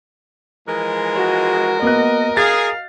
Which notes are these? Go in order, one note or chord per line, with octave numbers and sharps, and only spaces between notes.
E3 F3 G#3 A#4
F#4
A#3 B3 D#5 F#6
G#4 F5 A6